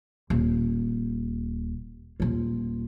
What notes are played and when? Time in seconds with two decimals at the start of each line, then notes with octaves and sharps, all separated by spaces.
0.30 D#1
2.20 D#1 F4